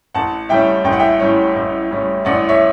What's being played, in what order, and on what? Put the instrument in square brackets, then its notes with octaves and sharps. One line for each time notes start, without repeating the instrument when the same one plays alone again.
[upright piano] A1 F#5 A5
A2 G3 C#4 E5 G5
A1 G5
F#5
E5 G5
A2 G3 C#4
A1
A2 G3 C#4
A1 D5 F#5
C#5 E5